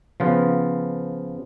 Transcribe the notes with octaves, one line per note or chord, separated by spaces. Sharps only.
C#3 F3 B3 F4